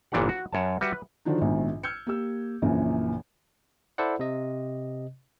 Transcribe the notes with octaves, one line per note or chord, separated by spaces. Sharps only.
G1 A#2 E3 D4 G4 F#5
F#4
F#2 C#5 A5
G3 F#4 B4 E5 F#5
B4
D3 D#3 F3 F#3 D4 D#4
A#1 G#2 B2 D#3 F3
E6 F6 G6 G#6 C#7
A#3 G4 E6
A#1 F#2 A#2 C#3 E3
E4 A4 C5 D5 F#5
C3 D#5